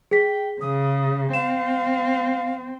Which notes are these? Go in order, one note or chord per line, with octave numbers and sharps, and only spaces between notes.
G#4 G5 B6
C#3 D#6
C4 F5 E7